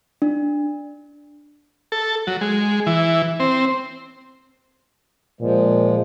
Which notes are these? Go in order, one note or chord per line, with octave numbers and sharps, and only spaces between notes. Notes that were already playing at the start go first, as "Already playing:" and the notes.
D4
A4
F#3
G#3
E3
C4
A#2 F3 G#3